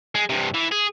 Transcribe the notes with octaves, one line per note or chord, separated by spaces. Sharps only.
G#3
G2 C3
E3
G#4